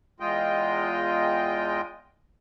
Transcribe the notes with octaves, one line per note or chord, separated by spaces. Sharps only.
E2 G#3 F4 D#5 G5